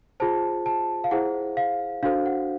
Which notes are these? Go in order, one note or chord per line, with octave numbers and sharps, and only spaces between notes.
F4 G#4 C5 A5
A5
F5
E4 G#4 C5 F#5
F5
D4 F#4 A4 C5 F5
F#5